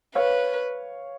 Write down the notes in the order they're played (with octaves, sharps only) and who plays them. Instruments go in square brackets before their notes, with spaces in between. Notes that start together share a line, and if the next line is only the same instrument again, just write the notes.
[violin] B4 [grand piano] C#5 F5